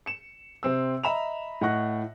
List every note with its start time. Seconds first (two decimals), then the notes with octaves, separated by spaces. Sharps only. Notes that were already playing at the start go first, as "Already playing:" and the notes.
0.06 C#7 E7
0.63 C3 C4 E6
1.04 D#5 E5 A#5 B5 E7 F7
1.61 A2 D#5 F#5 C#6 F#6 A#6